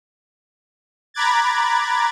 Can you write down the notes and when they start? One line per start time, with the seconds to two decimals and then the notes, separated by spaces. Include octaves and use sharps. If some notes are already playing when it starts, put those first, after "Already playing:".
1.14 A#5 B5 D6 F#6 G#6 A6